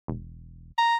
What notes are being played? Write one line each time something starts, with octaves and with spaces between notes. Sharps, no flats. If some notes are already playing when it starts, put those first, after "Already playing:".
E1
A#5